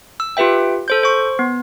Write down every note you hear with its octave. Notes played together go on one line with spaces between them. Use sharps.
E6
F4 G4 B4 E5 G5
A4 C5 G6
C5 C#6
B3